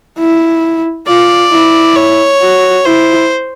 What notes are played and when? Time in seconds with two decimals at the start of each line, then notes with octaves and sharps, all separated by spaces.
0.19 E4
1.07 F4 D5
1.52 E4
1.96 C#5
2.42 F#4
2.85 E4 C5